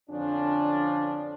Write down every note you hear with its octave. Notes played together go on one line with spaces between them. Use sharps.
F2 D3 F3 C#4 D4